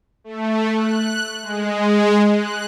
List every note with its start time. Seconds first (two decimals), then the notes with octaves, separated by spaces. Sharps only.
0.24 A3
0.75 F#6
1.42 G#3
2.35 F#6